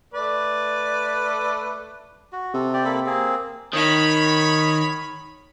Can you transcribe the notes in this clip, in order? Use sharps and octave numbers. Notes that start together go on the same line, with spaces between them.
A3 B4 D5
F#4
C3 A4
G4 D5
A#3 A4 B5
A#3 C4 G#4
D#3 C#5 B5